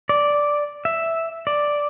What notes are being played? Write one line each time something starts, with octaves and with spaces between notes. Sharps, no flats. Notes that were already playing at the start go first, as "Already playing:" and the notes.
D5
E5
D5